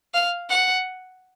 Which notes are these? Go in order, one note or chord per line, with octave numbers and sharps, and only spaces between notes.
F5
F#5